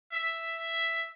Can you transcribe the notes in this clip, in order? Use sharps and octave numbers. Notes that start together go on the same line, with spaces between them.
E5